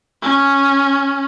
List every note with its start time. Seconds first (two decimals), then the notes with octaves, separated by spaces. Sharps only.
0.22 C#4